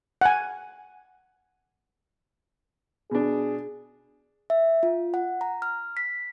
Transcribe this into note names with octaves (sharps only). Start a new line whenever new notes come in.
F#5 G#5
B2 D4 G#4
E5
F4
F#5
A#5
F6
B6